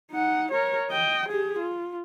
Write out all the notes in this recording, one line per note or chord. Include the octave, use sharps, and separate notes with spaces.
D#4 F#5
A#4 C#5
D#5 G5
G4 G#4
F4